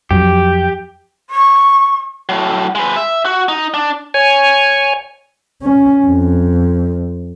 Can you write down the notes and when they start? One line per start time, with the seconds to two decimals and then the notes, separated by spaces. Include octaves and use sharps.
0.11 F2 F#3 G4
1.30 C#6
2.29 A2 F#3
2.75 G#3 B4
2.96 E5
3.25 F#4
3.49 D#4
3.74 D4
4.14 C#5 G#5
5.62 C#4
6.05 F2